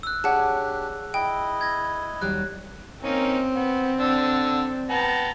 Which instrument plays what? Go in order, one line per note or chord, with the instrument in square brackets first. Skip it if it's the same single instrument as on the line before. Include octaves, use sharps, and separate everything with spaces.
[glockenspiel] E6 F#6
[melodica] D4 G4 [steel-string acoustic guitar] G#4 C#5 D5 [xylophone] F#5 A5
[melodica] E4 D#5 [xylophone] G5
[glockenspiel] G#6 A#6
[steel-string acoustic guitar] D#2 F#3 G3 [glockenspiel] F#6
[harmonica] A#3 C#4 D#4 [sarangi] C4
[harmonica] B3
D3 D4 E6
[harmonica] B3 G5 A5 [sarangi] A#5